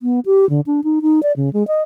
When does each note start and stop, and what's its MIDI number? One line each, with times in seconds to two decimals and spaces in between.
0.02 0.20 59
0.26 0.48 67
0.50 0.61 50
0.66 0.80 62
0.84 0.99 63
1.02 1.22 63
1.23 1.32 74
1.36 1.52 49
1.53 1.66 56
1.67 1.82 75